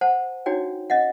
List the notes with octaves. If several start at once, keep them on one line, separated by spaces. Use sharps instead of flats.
C5 F#5 A5
D4 D#4 F#4 C#5 G5
C#4 D#5 E5 F#5